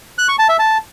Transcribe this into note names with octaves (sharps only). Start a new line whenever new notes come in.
F#6
C#6
A5
E5
A5